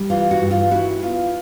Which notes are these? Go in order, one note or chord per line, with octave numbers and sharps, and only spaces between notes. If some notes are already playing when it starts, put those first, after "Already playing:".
Already playing: G3
E3 F4
F#4
G2
F4
E4 F#4
B3 F4